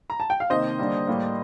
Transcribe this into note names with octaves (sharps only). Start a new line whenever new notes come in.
A#5
A5
G5
F5
C3 D#3 A#3 C5 D#5
D3 G3 A#3
A2 G3 A#3